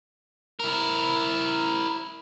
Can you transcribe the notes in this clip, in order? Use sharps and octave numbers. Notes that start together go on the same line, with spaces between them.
E4 A#4